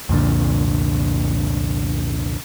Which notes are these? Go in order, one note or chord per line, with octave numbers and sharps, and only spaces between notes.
C2 F2 A#2 D3